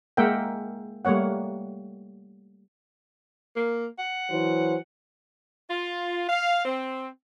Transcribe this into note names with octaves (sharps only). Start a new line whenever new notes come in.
G#3 A#3 A#4 E5 F#5 G5
G3 A3 A#3 C#5 F#5
A#3
F#5
E3 F#3 C5
F4
F5
C4